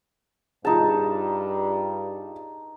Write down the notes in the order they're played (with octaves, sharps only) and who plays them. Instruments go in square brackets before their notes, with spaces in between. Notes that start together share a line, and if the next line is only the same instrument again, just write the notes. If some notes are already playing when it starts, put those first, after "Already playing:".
[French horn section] G2 [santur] D#4 A5 [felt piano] F4 G#4